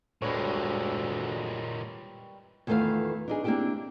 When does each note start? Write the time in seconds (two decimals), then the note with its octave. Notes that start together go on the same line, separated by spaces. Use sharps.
0.22 D2 A#2 G3 G#3 B4 C#5
2.67 E2 D#3 A3 F4 B4 F5
3.28 D4 D#4 G#4
3.44 A#3 C4 D4 E4 G4 G5